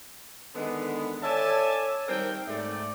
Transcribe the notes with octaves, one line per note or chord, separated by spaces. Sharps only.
D3 D#3 G#3 B3
A4 C#5 D5 E5 G#5 A5
D#3 G3 C4 A#4 G5
G#2 A3 D5